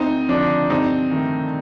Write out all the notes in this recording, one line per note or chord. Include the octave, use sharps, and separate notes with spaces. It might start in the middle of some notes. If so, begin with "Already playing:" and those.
Already playing: D2 C4 D#4
D3 F3 D4
G2 C4 D#4
D#3 A3